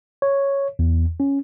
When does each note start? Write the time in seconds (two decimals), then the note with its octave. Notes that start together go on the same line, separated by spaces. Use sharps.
0.22 C#5
0.79 E2
1.20 C#4